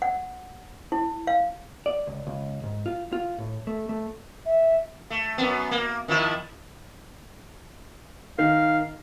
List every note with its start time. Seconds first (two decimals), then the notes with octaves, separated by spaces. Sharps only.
0.02 F#5
0.92 E4
1.27 F5
1.86 D5
2.07 C#2
2.27 C#2
2.64 G#2
2.86 F4
3.13 F4
3.38 A2
3.67 A3
3.89 A3
4.46 E5
5.10 A3
5.38 F#2 B3
5.71 A#3
6.08 D#3 F3 E4
8.38 D#3 F5